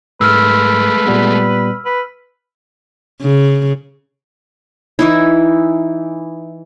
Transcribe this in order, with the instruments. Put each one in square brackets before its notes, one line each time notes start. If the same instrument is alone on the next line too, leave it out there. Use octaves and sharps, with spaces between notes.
[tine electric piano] G#2 [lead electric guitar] G#3 A3 [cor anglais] B4 [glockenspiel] E6 F6
[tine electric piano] A#2 G3 B3
[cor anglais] B4
[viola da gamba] C#3
[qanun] E3 D#4 E4